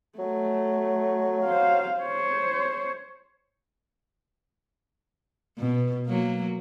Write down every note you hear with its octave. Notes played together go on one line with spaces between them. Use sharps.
F#3 A3
C5 F5
C5 C#5
B2
F#3 A#3